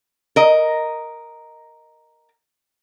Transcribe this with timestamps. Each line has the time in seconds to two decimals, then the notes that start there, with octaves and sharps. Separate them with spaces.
0.36 A#4 D#5